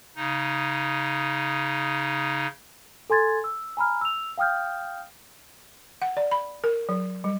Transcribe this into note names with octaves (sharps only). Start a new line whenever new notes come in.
C#3 D#4
A4 G#5 C6 G#6 A6
E6
G#5 A#5 B5 F6
E6 F7
F5 G5 D#6 F6 G6
F#5
D5
B5
A#4
F#3
G3